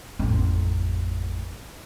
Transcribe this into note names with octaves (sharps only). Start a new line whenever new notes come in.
A1 F2